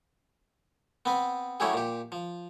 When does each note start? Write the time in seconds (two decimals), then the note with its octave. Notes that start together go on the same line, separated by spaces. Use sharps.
1.05 B3 C4 B4
1.60 F#3 A3 C#4 E4 G4 G#4
1.74 A#2 G4
2.12 F3